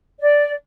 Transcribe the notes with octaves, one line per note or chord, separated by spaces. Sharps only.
D5